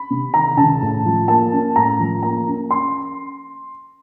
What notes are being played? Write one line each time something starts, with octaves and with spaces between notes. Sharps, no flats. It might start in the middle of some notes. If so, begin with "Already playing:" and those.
Already playing: B5
C3
D#3 A#5
C#2 A5
A2
F3
A#3 A5
C#4
A2 A#5
F3
A#3 A#5
C#4
C6